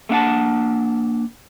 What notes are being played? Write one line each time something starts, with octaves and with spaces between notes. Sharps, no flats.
A3 A#3 D4 F5 F#5 A5